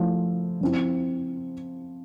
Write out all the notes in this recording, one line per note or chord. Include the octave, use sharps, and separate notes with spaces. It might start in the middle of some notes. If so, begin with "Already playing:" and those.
Already playing: F3 A3 E4
F3 C4 E4